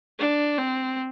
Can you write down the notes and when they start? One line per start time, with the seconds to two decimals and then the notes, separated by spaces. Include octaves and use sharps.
0.19 D4
0.58 C4